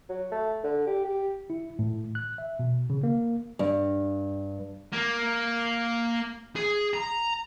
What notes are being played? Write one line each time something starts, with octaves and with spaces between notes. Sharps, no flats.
F#3
A3
D3
G4
G4
E4
A2
F#6
E5
B2
C#3
A#3
G2
A#3
G#4
A#5